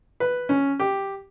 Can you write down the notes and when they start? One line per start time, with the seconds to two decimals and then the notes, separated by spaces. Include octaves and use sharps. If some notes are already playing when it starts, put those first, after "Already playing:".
0.20 B4
0.49 C#4
0.79 G4